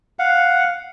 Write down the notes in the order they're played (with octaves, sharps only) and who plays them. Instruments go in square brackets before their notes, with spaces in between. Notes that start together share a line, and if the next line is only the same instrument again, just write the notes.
[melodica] F5 F#5